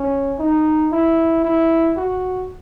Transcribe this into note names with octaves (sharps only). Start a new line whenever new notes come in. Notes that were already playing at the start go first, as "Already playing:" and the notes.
Already playing: C#4
D#4
E4
E4
F#4